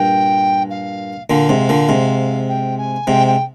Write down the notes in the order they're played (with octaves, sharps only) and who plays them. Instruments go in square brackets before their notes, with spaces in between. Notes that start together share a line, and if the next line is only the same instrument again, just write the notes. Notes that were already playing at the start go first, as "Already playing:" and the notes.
Already playing: [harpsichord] G2 A#2 [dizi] G5
[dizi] F5
[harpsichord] A#2 D3 [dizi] F5
[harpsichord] G#2 C3
[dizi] F5
[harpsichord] A#2 D3
G#2 C3
[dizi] G5
G#5
[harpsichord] G#2 C3 [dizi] G5
[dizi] G5